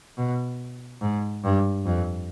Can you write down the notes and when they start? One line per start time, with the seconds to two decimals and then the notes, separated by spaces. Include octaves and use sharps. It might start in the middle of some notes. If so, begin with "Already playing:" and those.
0.17 B2
1.01 G#2
1.44 G2
1.85 F2